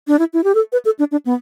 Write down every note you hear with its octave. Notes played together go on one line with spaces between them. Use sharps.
D4
E4
E4
G4
A4
B4
A4
D4
D4
B3